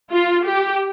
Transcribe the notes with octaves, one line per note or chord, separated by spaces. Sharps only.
F4
G4